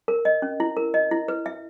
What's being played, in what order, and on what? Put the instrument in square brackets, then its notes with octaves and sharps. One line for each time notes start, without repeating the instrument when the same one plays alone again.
[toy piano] A#4
D#5
C#4
E4
A#4
D#5
E4
B4
E5